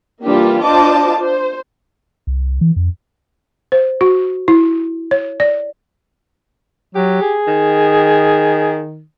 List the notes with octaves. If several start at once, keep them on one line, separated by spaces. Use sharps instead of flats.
E3 G3 A#3 D4 F4 G4
D4 F4 C5 D#5 A5 D6
C5
C2
E3
F2
C5
F#4
E4
C#5
D5
F#3 G4
G#4
D#3